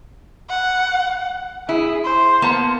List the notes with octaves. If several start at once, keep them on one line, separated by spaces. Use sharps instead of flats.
F#5
E4 G#4
C5
A#3 B3 A5